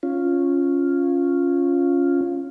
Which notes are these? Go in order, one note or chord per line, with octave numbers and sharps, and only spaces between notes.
C#4 F4